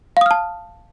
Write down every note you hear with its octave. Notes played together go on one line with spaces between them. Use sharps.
F5 A5 D#6 F6